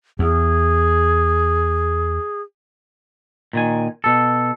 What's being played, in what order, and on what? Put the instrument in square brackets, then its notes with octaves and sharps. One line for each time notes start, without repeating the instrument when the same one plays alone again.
[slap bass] E2 [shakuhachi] G#4
[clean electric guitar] A#2 D#3 G#5
B2 A4